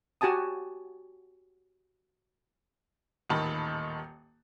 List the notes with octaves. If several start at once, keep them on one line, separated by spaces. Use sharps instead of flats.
F#4 G4 G#5 A5 D#6
D#1 A1 D#3 A5 B5